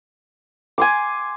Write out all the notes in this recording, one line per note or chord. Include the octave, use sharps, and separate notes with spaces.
G#5 C6 D6